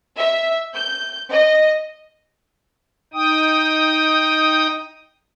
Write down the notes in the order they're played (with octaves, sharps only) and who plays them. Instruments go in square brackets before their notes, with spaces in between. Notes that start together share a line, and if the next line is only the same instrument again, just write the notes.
[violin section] E5
G6
D#5
[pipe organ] D#4 G5 D#6